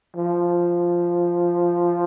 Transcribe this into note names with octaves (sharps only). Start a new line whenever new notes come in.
F3